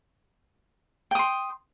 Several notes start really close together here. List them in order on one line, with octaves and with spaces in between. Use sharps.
G5 D#6 C6